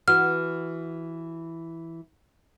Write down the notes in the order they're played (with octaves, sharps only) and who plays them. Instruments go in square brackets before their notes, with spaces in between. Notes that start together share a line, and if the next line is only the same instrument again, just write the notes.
[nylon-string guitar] E3 F#4 [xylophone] F6